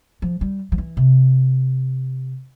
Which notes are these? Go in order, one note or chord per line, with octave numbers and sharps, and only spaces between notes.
F3
G3
F3
E3
C3